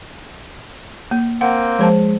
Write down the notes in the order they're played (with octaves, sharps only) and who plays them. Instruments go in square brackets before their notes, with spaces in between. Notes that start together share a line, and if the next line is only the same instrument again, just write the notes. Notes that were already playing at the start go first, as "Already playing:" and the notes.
[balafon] A#3
[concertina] A#3 C4 G5 [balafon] F#5
[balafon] F3 C5 A5 [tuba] G#3